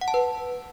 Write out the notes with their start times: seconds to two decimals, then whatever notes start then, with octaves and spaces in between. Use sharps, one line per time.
0.01 F#5
0.08 A5
0.14 B4